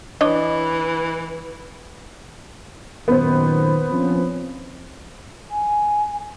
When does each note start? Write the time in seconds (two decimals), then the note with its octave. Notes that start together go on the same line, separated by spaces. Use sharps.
0.21 E3 D4 C#5 D#5
3.08 F#2 A#2 D#3 B3 C5
3.91 F3 C4 C#4
5.49 G#5